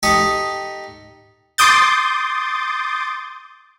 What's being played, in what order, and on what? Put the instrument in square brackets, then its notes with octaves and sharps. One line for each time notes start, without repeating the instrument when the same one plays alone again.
[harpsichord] D#4 G4 A4 C#6 D#6
[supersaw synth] C6 D6 D#6 G6 A6